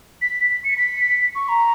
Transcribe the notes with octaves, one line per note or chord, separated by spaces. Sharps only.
B6
B6
C#7
B6
C#6
A#5